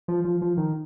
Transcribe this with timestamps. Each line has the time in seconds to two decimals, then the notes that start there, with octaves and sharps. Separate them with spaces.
0.08 F3
0.25 F3
0.42 F3
0.57 D#3